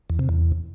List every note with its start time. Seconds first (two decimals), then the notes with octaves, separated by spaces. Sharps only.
0.10 E2
0.19 C3
0.29 E2